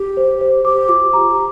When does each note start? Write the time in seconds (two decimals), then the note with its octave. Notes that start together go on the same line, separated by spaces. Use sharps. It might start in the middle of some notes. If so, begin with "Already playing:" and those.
Already playing: G4
0.17 C5
0.41 C5
0.65 G4 D6
0.89 F4 D6
1.13 G4 A#5
1.28 G4